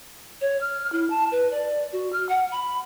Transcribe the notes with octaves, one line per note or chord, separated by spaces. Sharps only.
C#5
F6
E4
A5
B4
D5
F#4
F6
F#5
B5